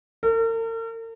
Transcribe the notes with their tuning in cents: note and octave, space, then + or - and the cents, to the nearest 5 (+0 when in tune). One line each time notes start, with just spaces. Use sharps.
A#4 -45